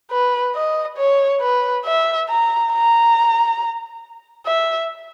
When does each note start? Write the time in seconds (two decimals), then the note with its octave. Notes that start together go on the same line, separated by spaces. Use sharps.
0.11 B4
0.55 D#5
0.98 C#5
1.41 B4
1.86 E5
2.29 A#5
2.73 A#5
4.46 E5